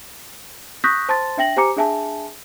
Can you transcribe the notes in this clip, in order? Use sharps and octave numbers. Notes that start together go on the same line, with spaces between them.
C#6 D#6 F#6 G6 A#6 B6
C5 A5 C6 A6
D4 E5 G5 A#6 F#7
G4 C5 G#5 A#5 D6 C#7
D4 G#4 E5 G#5 A5